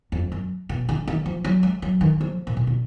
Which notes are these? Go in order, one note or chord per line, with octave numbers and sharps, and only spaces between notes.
F2
F#2
B2
D3
D#3
F3
F#3
G#3
F#3
D#3
F3
A#2
B2
D3